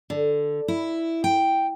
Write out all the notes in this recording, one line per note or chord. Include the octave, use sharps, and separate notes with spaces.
D3
E4
G5